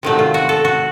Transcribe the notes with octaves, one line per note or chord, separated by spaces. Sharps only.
C3 D#3 F#3 A3
F4
F#4
A4
F#4